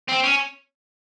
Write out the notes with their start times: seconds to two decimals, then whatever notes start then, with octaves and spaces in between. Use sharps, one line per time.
0.08 C4
0.23 C#4